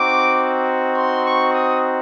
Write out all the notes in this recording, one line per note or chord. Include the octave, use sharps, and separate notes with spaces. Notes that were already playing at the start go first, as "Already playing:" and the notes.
Already playing: C4 D#4 F#4 D6
C6
C#6
D#6